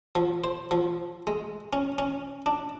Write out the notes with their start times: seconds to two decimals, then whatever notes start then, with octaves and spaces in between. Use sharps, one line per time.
0.15 F3
0.44 C5
0.71 F3
1.27 G#3
1.73 C#4
1.98 C#4
2.46 D4